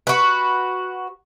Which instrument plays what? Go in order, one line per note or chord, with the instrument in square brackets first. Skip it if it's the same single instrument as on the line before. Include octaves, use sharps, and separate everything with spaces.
[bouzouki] F#4 B4